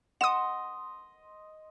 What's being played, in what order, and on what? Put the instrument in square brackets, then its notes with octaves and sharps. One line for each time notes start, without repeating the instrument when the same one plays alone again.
[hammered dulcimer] D#5 C6 [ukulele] F#5 [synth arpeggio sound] D#6 E7